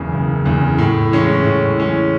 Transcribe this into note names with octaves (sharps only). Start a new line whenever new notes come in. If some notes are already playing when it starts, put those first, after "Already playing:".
Already playing: F#1 E2 C#3
F#1
E2 C#3
A2
E3 G#3 C#4
A2
E3 G#3 C#4